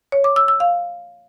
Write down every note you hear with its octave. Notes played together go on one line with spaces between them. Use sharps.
C#5
D6
E6
E6
F5